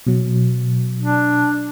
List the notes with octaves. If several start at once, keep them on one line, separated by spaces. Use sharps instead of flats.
B2 F#3
D4